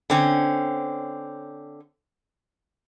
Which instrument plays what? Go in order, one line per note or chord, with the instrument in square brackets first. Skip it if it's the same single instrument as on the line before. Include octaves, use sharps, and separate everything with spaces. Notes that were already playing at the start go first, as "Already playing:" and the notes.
[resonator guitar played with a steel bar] D3 C4 C#4